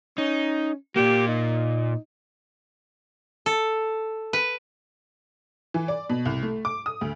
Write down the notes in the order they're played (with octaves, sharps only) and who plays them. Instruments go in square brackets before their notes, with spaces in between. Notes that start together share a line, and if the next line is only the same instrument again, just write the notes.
[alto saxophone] C#4 [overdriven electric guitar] D#4
[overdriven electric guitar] A#2 A#3 [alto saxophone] G4
[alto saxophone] D#4
[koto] A4
B4
[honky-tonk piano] E3
D5
B2
C2
A3
D6
D#6
D2